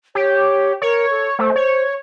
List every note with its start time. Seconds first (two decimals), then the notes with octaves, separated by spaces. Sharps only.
0.15 G4 C#5
0.82 A#4 C#5
1.10 A4
1.39 A3 C5
1.56 C#5